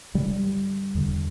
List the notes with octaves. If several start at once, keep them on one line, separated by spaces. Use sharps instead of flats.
G2 D3 G3
E2 D3